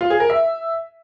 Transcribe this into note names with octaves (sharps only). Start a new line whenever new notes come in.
F4
G#4
A#4
E5